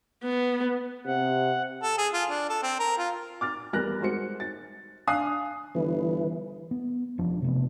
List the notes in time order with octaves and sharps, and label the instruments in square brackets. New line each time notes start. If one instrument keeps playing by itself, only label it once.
[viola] B3
[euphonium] C3 [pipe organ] F#5
[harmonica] A4
G#4
F4
D4
A4
C4
A#4
F4
[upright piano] D6 F6 A6
E2 G3 A#4 F6 F#6 A#6
G#3 F#4 C5 C#7
A6
D4 F5 G#5 D#6 F#6 C7
[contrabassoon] G1 [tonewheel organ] E3
[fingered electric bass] B3
E1 F3 D4
C3 A3 B3